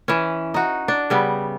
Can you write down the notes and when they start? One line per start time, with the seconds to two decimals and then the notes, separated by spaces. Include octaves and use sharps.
0.08 E3 C#4
0.54 D#4 F#4
0.88 D4
1.10 C#3 G3 B3